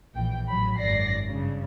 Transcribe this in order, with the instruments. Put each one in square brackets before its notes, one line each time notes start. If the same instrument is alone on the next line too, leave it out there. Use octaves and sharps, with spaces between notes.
[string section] A#1 E3 G5
A1 F#3 B5
G#1 F#2 F#3 D5 A#6 C7
G2 C#3